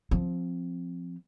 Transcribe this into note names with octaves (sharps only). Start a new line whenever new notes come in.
F3 C4